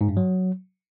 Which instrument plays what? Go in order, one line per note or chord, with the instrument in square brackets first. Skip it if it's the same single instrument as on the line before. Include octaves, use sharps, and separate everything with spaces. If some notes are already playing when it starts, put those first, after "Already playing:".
[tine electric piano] G#2
G2
F#3